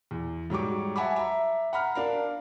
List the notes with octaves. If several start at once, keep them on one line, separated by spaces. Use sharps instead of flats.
E2
G#2 F#3 G3 C#6 D6
E5 F#5 G#5 A5 B5 D6
E5 A#5
F#5 A#5 B5 F6
D4 A#4 F5